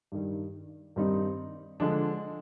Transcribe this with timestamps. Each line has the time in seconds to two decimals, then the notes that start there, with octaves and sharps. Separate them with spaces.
0.12 G2 D#3 G3
0.96 G2 D#3 G3 C4 D#4
1.80 D3 F3 G#3 D4